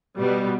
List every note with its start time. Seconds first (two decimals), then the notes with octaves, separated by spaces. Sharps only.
0.18 B2 G3 B3